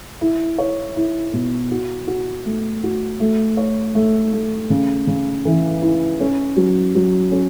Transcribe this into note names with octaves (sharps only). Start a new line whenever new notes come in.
E4
C#5
E4
B2
F#4
F#4
A3
F#4
A3
C#5
A3
A3
C#3
C#3
E3
E4
C#4
F#3
F#3
C#4